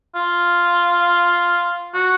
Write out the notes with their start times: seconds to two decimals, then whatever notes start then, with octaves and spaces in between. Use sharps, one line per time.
0.15 F4
1.95 F#4